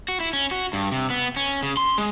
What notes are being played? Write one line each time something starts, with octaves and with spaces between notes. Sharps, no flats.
F#4
E4
C#4
F#4
G2
C3
B3
C#4
C#3
C6
G#3